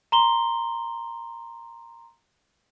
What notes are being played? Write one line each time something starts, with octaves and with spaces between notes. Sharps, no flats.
A#5 C6 G7